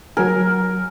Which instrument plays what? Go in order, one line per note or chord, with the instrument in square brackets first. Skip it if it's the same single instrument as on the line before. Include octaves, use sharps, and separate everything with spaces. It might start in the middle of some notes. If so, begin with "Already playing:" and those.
[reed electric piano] F#3 G#5 [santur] A#4